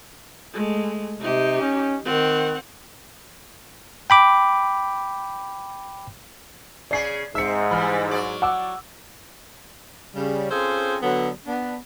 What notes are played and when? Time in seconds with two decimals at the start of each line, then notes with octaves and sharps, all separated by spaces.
0.53 G#3 A3
1.20 C3 D#4 G4
1.60 C#4
2.05 D#3 C4 F#5
4.10 G5 B5 D6
6.91 C#3 G#4 D5 C7
7.35 G#2 C4 E5 E6 C#7
7.71 E3 G3 B5 F6
8.11 F#3 D5
8.42 F#5 D6 E6
10.15 C#3 G3
10.50 C4 C#4 F4 G#4 A4 C5
11.02 D3 F#3 B3
11.46 B3 D4